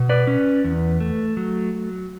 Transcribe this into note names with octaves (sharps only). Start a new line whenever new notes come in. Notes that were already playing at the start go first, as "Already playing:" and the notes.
Already playing: B2
B4 D5
C#4
E2
A3
F#3